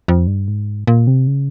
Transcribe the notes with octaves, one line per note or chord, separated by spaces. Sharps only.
F2
G2
G#2
A#2
C3
C#3